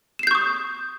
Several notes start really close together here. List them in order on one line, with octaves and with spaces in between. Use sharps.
E7 C7 G6 C#6 D#6